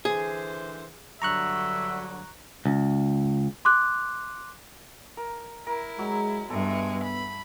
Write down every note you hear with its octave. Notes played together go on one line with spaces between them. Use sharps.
D3 E3 G#4 C5
G2 D3 F#3 E5 A#5 C#6 F#6
C#2
C6 D6 F#6
A#4
E4 A#4
F#3 G#3
G2 G#3 B3 A4 E5
B5